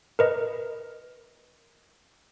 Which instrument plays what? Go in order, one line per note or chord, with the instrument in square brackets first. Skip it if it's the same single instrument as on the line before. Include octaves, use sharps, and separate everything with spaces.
[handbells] A#4 B4 D#5